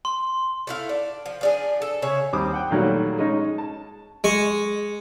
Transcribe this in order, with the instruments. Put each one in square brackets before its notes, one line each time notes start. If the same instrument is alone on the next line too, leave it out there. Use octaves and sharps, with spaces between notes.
[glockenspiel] C6
[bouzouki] A3 E4 F5
D4
F3
F3 D4 G#4
A4
C#3 C#5 E5
[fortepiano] D#2 G3 C4 C5 D6 D#6
F#5 G5
A#2 D#3 F#3 G3 A3 F#4
G#3 C#4 D#4
A5
[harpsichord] G#3 C#6